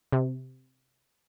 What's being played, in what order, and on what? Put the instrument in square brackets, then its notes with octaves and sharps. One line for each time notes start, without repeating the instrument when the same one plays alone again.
[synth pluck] C3